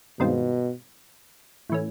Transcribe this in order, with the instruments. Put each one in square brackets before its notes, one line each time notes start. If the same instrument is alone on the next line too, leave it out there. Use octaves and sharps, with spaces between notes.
[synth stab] G2 D#3 G#3 C4 F4 [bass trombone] B2
[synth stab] A2 E3 A3 C#4